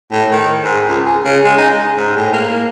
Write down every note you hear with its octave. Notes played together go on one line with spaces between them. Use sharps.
A2
D#3
G#2
C#2
G#4
C#3
G#3
D#4
G#3
G#2
A2
A#3